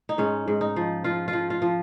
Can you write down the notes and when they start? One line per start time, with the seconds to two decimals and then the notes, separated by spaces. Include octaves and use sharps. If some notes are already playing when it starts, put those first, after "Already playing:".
0.09 D#4
0.18 G#2 C#4
0.48 G#2
0.61 D#4
0.76 F3
1.04 F3 F4
1.28 F4
1.33 F3
1.50 F4
1.62 F3